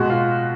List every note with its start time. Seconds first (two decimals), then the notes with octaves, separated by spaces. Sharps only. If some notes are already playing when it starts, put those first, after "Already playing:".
Already playing: B2 G#3 F#4
0.10 F4